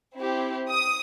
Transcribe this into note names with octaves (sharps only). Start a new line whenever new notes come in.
C4 E4 G4
D#6